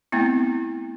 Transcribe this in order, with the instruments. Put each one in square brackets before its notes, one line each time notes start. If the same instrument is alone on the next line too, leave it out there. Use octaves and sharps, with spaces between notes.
[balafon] A3 B3 C4 E4